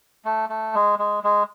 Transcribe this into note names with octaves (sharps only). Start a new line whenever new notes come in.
A3
A3
G#3
G#3
G#3